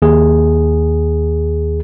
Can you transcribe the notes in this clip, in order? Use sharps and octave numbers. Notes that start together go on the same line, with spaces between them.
D#2 G#4